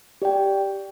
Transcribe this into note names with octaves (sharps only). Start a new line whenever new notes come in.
G4 D5 G5